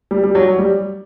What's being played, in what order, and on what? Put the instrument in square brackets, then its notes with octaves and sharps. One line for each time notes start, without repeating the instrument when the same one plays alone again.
[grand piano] G3
G3
F#3
G3